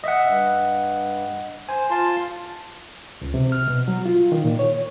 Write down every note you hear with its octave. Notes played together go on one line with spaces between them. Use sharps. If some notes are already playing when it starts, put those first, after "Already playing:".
D#5 E5 F#5
G2
C5 G#5
F4 A5 C6
C#2
C3
F6
B2
F#3
F4
D#3
A#2
C#5